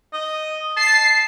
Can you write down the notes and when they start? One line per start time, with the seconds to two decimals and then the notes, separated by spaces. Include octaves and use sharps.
0.13 D#5
0.77 A5 C7